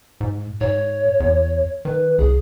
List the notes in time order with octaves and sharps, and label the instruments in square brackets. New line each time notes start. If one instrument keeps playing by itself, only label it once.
[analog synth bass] G#2
[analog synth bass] G#2 [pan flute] C#5
[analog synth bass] E2
[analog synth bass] D#3 [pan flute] B4
[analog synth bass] C2 [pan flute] G#4